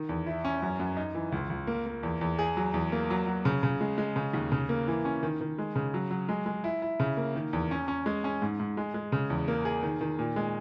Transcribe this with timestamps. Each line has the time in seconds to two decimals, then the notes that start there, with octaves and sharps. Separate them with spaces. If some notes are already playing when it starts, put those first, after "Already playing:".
Already playing: D#3
0.09 E2
0.26 E4
0.44 C#4
0.62 F#2
0.80 F#2
0.97 D#4
1.15 E3
1.32 C#2
1.50 C#2
1.67 A#3
1.86 A#3
2.03 E2
2.21 E2
2.39 G#4
2.57 F#3
2.74 E2
2.92 A#3
3.10 F#3
3.27 F#3
3.45 C#3
3.63 C#3
3.81 G#3
3.98 G#3
4.16 C#3
4.33 D#2
4.52 C#3
4.69 A#3
4.88 E3
5.05 C#4
5.23 D#3
5.41 D#3
5.58 G#3
5.76 C#3
5.94 F#3
6.11 F#3
6.29 G#3
6.46 G#3
6.64 E4
6.82 E4
7.00 C#3
7.17 A#3
7.35 D#3
7.53 E2
7.71 C#4
7.88 C#4
8.06 G#3
8.24 C#4
8.42 G#2
8.60 G#2
8.77 G#3
8.94 G#3
9.12 C#3
9.30 E2
9.48 A#3
9.65 G#4
9.83 D#3
10.01 D#3
10.19 A#2
10.36 G#3